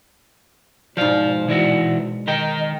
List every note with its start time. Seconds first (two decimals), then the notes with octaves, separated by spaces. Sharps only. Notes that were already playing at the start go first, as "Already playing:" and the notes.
0.97 G#2 B2 F3 C5 D5 F5
1.48 E3 E4 F#4 D5
2.27 D#3 A#4 D#5 G5